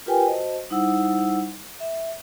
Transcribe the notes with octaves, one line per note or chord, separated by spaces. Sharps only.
F4 G4 A#4 B4 G5 G#5
F#4 C5 D#5 A5
G3 D#4 E4 C5 F#5 E6
E5